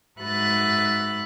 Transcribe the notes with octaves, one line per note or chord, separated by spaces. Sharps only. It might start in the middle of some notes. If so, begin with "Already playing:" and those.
G#2 F#4 B4 E5 F#6 A6